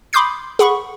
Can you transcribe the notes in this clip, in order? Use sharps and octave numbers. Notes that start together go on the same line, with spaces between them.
B5 C6 D6 D#6 G6 C7
G#4 F#5 B5 C#6